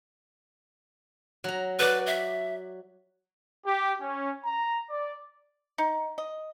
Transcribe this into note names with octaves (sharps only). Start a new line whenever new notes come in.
F#3 A#5
F#4 B4 D5
E5
G4
C#4
A#5
D5
D#4
D#5